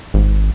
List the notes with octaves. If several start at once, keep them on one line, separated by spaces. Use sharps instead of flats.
G#1